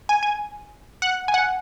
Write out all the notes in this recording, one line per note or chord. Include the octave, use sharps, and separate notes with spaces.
G#5
G#5
F#5
G#5
F#5